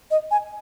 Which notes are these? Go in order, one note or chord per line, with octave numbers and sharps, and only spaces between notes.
D#5
G#5